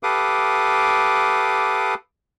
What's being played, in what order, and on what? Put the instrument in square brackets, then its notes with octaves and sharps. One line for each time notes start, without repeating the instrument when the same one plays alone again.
[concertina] G4 A4 B4 F5 D6 D#6